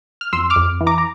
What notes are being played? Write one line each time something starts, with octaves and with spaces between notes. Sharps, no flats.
F6
F2 C6 E6
D6 F6
F2
E3
A#5 D6
A#5